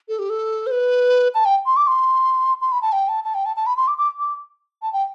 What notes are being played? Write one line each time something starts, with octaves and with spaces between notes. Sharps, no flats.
A4
G4
A4
C5
B4
A5
G5
C6
D6
C6
C6
B5
A5
G5
A5
A5
G5
A5
A5
B5
C6
D6
D6
D6
A5
G5